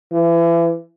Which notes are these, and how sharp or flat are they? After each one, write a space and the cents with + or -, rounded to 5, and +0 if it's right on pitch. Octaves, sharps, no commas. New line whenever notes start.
E3 +35